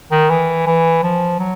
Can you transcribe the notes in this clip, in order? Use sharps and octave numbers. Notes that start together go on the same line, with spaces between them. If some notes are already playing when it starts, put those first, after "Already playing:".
D#3
E3
E3
F3
F#3